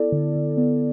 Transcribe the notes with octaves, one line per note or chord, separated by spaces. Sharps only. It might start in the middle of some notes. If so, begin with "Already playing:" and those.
Already playing: B3 E4 A4 D5
D3
D3
B3